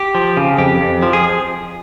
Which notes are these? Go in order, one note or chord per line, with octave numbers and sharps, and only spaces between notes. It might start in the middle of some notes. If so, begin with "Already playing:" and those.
Already playing: G4
F3
C#3
F2 G4
F2
F3
G#4